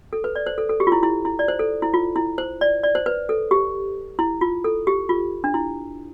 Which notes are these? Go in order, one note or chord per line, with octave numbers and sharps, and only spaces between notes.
A4
B4
D5
C5
A4
A4
G4
F4
E4
E4
E4
D5
C5
A4
E4
F4
E4
C5
D5
D5
C5
B4
A4
G4
E4
F4
A4
G4
F4
D4
E4